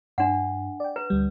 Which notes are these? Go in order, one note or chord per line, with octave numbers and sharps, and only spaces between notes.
G2 D4 F#5
D5 G5
B4 A#5
D2 G3